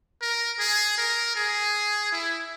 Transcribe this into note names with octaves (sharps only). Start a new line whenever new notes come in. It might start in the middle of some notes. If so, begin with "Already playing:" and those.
A#4
G#4
A#4
G#4
E4